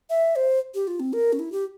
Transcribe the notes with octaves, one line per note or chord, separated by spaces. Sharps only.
E5
C5
G4
F4
C4
A#4
C#4
E4
G4